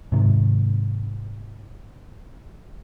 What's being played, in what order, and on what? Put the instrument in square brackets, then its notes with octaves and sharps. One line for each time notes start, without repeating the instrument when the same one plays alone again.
[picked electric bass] G#2 C3 D#3